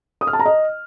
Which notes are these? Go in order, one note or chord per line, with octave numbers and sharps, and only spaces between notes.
D#6
F6
A5
A#5
D#5